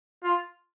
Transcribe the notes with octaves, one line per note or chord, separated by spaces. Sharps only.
F4